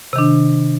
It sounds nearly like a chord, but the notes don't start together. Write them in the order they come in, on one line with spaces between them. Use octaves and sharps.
C3 D#3 D4